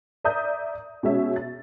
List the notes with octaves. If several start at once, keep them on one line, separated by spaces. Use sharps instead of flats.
D5 E5 A#5 D#6 G6
B2 G#3 C#4 E5
A6